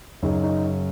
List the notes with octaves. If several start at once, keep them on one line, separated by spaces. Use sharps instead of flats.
F#2 C#3 D#4
D#4